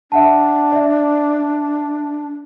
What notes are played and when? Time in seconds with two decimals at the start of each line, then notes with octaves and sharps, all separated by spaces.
0.12 D4 E5 F#5 A5
0.72 D5 E5